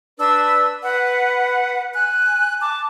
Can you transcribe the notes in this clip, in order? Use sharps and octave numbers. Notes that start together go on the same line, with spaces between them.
D4 B4 E6
B4 F#5
G#5 F#6
A5 D6